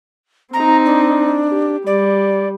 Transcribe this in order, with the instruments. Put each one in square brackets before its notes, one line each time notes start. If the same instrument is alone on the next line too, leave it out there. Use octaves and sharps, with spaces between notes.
[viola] C4 D#4 [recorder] A#5
[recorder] D4
[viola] G4
[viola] G3 [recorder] D5